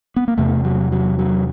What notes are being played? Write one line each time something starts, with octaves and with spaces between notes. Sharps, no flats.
B3
A#3
E2 C3 A3
F#3
F#3
F#3